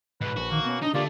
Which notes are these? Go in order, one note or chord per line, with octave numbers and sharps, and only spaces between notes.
G#2 B2 B4
A#1 F#4
D#3 A#3
B2 B3 C#4
D4 D#4 D#5
D2 A3 A#3 F4 G4 D5